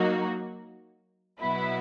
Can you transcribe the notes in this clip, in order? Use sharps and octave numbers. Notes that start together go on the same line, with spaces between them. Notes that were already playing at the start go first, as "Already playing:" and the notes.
Already playing: F#3 A#3 D#4 F#4
B2 F#3 B3 E4